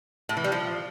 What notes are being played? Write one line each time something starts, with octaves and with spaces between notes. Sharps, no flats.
A2
E3
G3
F3